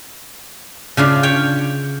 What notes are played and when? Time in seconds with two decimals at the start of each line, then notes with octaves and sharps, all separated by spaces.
0.97 C#3 D4 F4 E5
1.23 C#5 G5